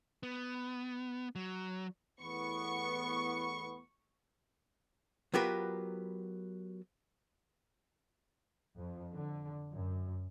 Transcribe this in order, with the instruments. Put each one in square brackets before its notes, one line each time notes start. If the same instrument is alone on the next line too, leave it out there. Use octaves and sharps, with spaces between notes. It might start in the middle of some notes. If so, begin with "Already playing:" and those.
[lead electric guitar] B3
F#3
[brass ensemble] E2 A2 B3 [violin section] C#6
[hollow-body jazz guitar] F#3 B3 F4 G4 A#4 B4
[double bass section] F2
D3
F#2